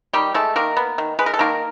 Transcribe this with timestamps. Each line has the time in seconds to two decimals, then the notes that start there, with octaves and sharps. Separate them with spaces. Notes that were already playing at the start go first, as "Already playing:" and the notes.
0.13 D#3 G3 G4
0.34 G#3 A3 A4
0.56 D#3 A#3 A#4
0.77 B3
0.98 D#3
1.19 G#3 B4
1.26 A#4
1.34 A4
1.39 D#3 A#3 A#4